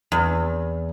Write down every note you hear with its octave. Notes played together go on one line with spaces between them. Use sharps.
E2